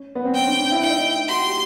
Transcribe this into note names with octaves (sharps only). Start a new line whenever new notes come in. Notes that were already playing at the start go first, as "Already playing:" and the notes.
Already playing: C#4
B3
C4
C#4 G5
D4
D4
E4
E4 G5
D#4
E4
F#4 C6
G4